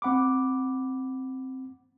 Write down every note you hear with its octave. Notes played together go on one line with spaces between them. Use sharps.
C4 F#5 B5 D6